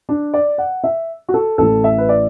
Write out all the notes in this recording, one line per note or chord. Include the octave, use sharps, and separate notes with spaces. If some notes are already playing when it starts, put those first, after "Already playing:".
D4
D5
F#5
E5
F#4
A4
A1 A2 E3 A4
E5
B4
D5